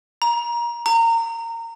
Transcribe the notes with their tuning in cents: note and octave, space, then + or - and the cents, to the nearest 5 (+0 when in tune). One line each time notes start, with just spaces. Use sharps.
A#5 +25
A#5 -25